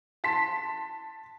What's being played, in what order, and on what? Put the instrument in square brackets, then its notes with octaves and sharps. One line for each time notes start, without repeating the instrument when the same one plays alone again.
[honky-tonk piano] A5 C6 B6